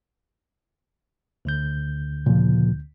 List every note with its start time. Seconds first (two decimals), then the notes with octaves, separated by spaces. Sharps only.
1.45 D2 D3 G6
2.26 A#2 C#3 F3